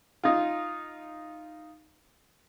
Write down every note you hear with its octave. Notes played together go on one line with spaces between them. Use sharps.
D#4 F4